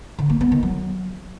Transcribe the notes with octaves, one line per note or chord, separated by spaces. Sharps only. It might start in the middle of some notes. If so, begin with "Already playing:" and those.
D3
A#3
B3
D#3
F#3